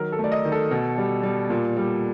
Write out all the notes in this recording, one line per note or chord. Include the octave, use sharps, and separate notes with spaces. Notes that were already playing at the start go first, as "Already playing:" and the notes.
Already playing: D#3 F#3 A#4
A4
A3
D5
D#5
D#3
A4
B2
G3
G3
A#2
G3